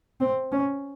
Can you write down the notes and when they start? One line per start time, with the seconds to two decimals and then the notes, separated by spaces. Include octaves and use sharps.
0.21 C4
0.52 C#4